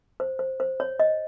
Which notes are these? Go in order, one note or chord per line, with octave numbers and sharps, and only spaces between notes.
C5
C5
C5
C#5
D#5